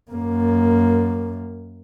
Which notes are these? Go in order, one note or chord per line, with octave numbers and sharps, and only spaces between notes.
F#2 A#3